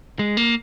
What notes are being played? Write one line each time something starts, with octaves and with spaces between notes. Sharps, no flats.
G#3
A#3